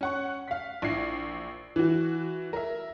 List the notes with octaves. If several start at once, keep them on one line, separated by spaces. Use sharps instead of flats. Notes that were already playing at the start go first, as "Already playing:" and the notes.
C#4 F#5 C#6
F5 B6
A#1 E4 C7
E3 F#4
A#4 E5